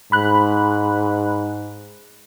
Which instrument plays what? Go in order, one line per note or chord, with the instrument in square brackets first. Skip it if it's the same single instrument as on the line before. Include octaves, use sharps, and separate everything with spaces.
[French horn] G#2 [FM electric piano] B5 F#6